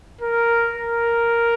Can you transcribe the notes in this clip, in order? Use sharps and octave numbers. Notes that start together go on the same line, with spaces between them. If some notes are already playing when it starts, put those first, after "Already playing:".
A#4
A#4